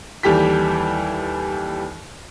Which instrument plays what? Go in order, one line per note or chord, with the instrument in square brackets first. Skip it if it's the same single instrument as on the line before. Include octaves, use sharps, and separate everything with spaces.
[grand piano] D#2 E3 G3 G4 A4 B6